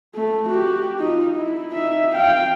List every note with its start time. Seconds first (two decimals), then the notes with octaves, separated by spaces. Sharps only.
0.15 A3
0.49 F#4 G4
0.99 D#4 F4
1.35 E4
1.73 D#4 E5
2.14 F5 G5